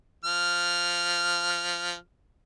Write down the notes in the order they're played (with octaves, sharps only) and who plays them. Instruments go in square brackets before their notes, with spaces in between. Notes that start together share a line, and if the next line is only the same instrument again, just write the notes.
[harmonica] F3 F6